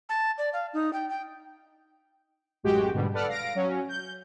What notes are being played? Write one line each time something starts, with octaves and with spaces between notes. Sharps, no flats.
A5
D5
F5
D#4
G5
G5
A1 F#2 G#3 F#4 G4 G5
G#2 B2 D3 G3
A4 B4 D5 F#5 F6
F5 A#6 D7
F#3 C#4
G6